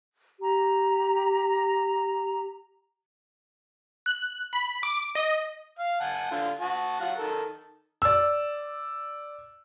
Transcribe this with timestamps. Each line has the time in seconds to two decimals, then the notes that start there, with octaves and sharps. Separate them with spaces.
0.39 G4 A#5
4.06 F#6
4.53 B5
4.83 D6
5.15 D#5
5.79 F5
6.00 F#5 G#5 A5
6.31 D3 F4
6.61 F#4 A5
7.00 F#3 F4 F#5
7.18 D#3 A4 A#4
8.02 D5 E6